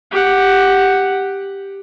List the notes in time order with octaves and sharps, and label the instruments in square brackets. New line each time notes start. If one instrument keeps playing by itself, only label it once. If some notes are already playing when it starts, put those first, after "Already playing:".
[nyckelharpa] G4 F#5